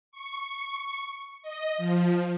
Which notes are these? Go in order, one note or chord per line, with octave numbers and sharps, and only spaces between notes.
C#6
D#5
F3